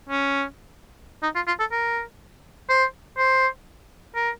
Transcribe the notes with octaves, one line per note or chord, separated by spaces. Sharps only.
C#4
D#4
F4
F4
A4
A#4
C5
C5
A#4